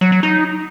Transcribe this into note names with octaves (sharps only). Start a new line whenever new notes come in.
F#3
F#3
D#4